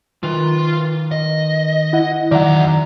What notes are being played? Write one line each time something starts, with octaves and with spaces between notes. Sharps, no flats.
D#3 F4 B4
D#5
E4 F#5
E2 D#3 F#3 D5 E5 F#5 A#5